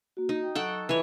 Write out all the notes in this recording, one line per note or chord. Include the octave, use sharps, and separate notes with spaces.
A#3 F#4
D#4 F#4
G5
F#3 A4 F#5 G5 C#6
E3 F4 C#5